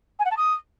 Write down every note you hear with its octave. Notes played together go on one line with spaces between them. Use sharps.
G#5
F#5
A5
D#6